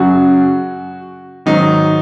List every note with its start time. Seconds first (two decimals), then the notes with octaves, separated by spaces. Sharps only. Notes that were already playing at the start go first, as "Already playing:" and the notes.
Already playing: F#2 C#3 F#3 F#4
1.46 G#2 D#3 F#3 D#4